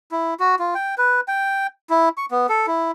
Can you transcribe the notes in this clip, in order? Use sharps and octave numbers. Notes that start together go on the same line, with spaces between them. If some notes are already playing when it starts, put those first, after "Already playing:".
E4
F#4
F4
G5
B4
G5
E4
C#6
B3
A4
E4